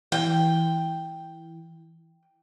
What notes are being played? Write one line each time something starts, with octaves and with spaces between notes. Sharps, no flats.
E3 G5